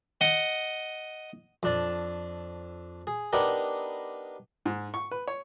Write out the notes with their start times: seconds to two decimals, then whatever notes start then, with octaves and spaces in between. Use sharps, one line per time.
0.21 D#5 F#5
1.63 F2 D4 A5
3.07 G#4
3.33 B3 D4 D#4 G4 A#4
4.65 G#2
4.94 C#6
5.11 B4
5.27 C#5